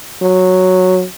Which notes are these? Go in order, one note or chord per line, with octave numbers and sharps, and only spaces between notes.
F#3